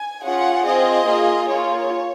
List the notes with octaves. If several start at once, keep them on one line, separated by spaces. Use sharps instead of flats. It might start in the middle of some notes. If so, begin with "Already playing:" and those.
Already playing: G#5
C#4 F4 G#4 F#5
C4 F4 G#4 D#5
A#3 F4 G#4
A#3 F4 G#4 C#5